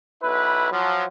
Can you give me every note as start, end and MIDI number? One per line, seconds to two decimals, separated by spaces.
0.23 0.68 35
0.23 0.68 64
0.23 0.68 71
0.71 1.04 53
0.71 1.04 54